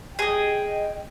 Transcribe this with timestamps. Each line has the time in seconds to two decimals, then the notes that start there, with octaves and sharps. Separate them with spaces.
0.19 G#4 D#5 G5